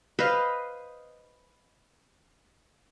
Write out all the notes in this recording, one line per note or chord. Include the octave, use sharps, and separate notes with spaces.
B4 C5 D#5 F5